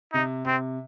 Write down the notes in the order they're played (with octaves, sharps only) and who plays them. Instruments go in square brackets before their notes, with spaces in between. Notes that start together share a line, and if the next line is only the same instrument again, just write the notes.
[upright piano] C3 [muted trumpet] D#4
[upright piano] C3 [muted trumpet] C4